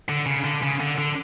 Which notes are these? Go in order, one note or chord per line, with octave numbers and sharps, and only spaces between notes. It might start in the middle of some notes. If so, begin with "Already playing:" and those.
D3
C#3
D3
C#3
D3
D3